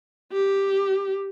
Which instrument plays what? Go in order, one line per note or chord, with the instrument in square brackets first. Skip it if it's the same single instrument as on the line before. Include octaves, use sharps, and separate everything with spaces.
[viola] G4